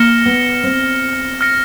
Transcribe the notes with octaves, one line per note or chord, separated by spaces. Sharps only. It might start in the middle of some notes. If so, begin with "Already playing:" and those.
Already playing: A#3 F6 A#6 C#7 E7 G7
B3
C4
F6 A#6 C#7